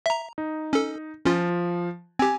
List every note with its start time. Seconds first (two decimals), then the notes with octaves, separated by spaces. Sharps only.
0.06 E5 A#5
0.38 D#4
0.73 C#4 A4
1.26 F3 C#4 F4
2.19 C4 G4 G#5